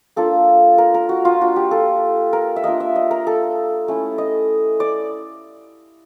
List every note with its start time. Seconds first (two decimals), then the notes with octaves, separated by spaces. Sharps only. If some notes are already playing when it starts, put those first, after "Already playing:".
0.16 A#3 D4 F4 A4
0.78 A#4
0.94 A#4
1.09 F#4
1.25 F4
1.41 A#3 D4 F4 F#4
1.56 G4
1.71 A4
2.33 A#4
2.56 E5
2.64 A#3 D4 F4 D#5
2.80 E5
2.96 D#5
3.11 A#4
3.27 A4
3.88 A3 C#4 E4
4.18 D#5
4.80 D5